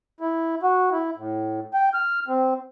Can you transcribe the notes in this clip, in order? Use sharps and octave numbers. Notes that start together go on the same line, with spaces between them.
E4
F#4
E4
A2
G5
F6
C4